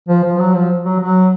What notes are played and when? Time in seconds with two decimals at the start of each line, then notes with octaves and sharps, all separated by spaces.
0.09 F3
0.24 F3
0.39 F#3
0.54 F3
0.85 F#3
1.00 F#3